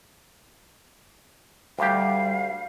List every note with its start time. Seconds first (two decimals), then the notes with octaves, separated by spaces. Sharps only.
1.79 D2 G3 G4 F5